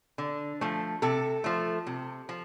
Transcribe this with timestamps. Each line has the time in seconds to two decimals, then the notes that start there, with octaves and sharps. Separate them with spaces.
0.18 D3
0.61 F3 A3
1.02 C3 A4
1.44 F3 A3
1.87 C3
2.29 F3